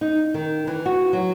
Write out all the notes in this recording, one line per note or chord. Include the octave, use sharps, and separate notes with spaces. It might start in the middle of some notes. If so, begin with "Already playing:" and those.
D#4
D#3
E3
F#4
F#3